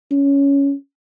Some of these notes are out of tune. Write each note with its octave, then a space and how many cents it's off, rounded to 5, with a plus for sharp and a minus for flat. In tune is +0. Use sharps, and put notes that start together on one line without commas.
C#4 +10